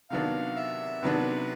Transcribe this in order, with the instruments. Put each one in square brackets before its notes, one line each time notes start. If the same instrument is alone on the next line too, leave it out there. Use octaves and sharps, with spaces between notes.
[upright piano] C3 D#3 F#3 B3 D4 [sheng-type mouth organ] F5
[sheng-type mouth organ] E5
[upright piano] C3 D#3 F#3 B3 D4 [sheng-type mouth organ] B4